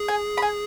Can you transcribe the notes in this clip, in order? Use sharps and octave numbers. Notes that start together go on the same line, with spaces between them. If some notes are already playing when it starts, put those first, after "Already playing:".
Already playing: G#4
G#5
B5
G#5